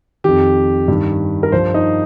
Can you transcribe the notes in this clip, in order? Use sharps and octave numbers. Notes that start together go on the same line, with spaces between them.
F2 D#3 G4
G2 D#3
A#4
G2 F3 C5
D#4